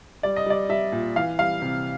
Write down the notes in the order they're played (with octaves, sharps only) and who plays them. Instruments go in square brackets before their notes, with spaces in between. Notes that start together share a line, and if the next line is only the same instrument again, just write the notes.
[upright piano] G3 D5
D#5
G3 D5
G3 E5
A#2
E3 F5
G3 F5
C3